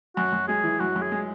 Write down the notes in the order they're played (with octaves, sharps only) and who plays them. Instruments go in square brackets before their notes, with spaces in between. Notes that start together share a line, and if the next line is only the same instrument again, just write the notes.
[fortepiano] F#2 [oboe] F#4
[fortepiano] F#2
[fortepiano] G#3 [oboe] G#4
[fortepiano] E3
[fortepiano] F#2 [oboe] F#4
[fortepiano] F#2
[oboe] G#4
[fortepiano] G#3